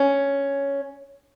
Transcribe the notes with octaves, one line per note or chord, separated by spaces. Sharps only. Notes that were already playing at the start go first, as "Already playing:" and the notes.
Already playing: C#4